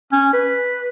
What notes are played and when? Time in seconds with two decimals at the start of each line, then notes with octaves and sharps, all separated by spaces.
0.12 C#4
0.33 B4